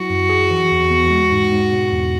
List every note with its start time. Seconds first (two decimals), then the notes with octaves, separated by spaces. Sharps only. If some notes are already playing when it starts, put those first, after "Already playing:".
Already playing: F#3 E4 F#4
0.10 F#2
0.29 G#4
0.51 E3
0.71 E2
0.91 E2
1.10 G#3
1.32 G#2
1.52 G#2
1.72 B2
1.92 E2